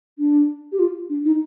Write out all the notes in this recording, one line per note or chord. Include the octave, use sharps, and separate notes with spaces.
D4
G4
F4
D4
D#4